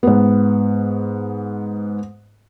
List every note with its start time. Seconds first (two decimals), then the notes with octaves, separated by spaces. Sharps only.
0.03 G#2 B3